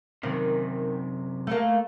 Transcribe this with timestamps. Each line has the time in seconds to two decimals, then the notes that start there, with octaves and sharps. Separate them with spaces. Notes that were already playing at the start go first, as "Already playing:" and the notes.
0.23 F#2 C3 D#3
1.47 A3 A#3